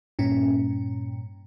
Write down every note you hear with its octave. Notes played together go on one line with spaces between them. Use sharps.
G2 A#2 C#4